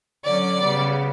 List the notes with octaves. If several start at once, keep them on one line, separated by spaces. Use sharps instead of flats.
D3 F#3 C#4 D5
C#3 G3 B3